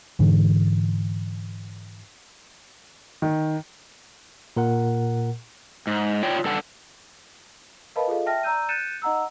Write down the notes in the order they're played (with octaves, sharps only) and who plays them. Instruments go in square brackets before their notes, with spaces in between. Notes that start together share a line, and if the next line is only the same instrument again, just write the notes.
[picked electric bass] G#2 D3 E3
[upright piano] D#3
[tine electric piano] A#2 A#4 F#5
[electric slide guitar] G#2
F4 C#5 D5 G5
G2 A4 F#5
[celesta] A#4 B4 D#5 F5 A5 B5
F4 G#4 A4 D#5 F5
E5 G5 A5 F6 A#6
D5 A#5 E6 G6 D#7
F#6 G6 A6 C#7 D#7 E7
D#4 D#5 F#5 A#5 E6